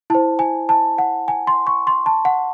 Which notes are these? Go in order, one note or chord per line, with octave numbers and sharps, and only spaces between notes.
E4 C5 A5
G#5
A5
F#5
G#5
C6
C#6
C6
A5
F#5